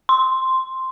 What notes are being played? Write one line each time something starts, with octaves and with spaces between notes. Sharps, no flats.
C6